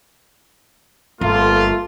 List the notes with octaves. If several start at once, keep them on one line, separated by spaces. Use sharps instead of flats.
G1 A3 A#3 F4